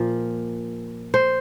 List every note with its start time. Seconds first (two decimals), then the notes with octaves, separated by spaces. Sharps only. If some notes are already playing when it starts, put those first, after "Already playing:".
Already playing: A#2 F3
1.14 C5